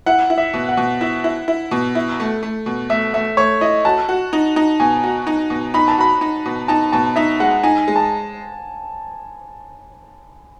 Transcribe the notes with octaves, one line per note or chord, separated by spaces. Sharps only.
E4 F#5
E4
E5
B2
F#5
B2
E4 E5
E4
E4
B2
E4
A3
A3
B2
A3 E5
A3 E5
A3 C#5
E4 D#5
F#4 A5
F#4
D#4
D#4
B2 G#5
F#4
D#4
B2
D#4 B5
A5
F#4 B5
D#4
B2
D#4 A5
B2 A5
D#4 E5
G#3 F#5
D#4 G#5
G#3
A5